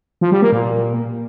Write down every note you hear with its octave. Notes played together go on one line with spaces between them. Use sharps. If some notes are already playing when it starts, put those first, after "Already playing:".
F3
G3
A#3
A#2